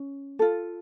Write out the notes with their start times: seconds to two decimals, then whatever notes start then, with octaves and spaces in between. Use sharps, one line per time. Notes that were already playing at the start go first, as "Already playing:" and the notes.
Already playing: C#4
0.39 F4 A4